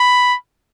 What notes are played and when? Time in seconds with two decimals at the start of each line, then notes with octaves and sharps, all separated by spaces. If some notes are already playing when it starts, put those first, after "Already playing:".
Already playing: B5